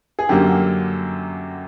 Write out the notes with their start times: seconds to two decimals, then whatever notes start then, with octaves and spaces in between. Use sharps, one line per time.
0.19 G#4
0.29 F#2 D3 F#3 A#3 G4